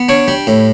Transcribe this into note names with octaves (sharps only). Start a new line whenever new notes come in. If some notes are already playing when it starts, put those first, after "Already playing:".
Already playing: B3
D4 C#5
G3
A2